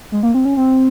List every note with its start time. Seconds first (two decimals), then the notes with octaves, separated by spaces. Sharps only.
0.12 G#3
0.23 A#3
0.34 C4
0.45 C#4
0.57 C4